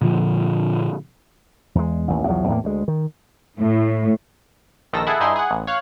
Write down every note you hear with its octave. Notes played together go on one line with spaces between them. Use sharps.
A#2 D3 F3
E2 G#3
A1 D#2
B1 E2 F3 F#3
E2 A2 A3 A#3
D2 G#3
D#3
A2
A#1 D#3 A4 E6 A#6
E4 G#4 A4 F#5
G2 D#4 E4 G#4 C6
G#4 F#5
A1
C#5 F5 F#6